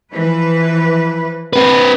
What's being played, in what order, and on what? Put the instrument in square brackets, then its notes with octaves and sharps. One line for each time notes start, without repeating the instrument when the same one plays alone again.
[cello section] E3 F3 B4
[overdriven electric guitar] C4 B4